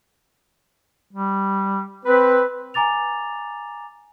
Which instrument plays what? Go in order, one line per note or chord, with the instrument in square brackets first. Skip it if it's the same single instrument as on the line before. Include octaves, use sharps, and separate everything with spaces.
[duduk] G3
[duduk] C4 [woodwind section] B4
[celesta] G#5 A#5 D6 A6 F7